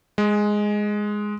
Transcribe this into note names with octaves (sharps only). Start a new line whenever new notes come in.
G#3